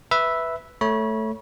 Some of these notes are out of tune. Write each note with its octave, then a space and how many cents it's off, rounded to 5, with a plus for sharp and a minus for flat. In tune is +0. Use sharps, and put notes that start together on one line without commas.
B4 +0 E5 -5
A3 +0 C#5 +0 B5 -35